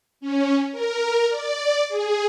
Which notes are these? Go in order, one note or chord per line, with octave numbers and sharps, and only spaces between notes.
C#4
A#4
D5
G#4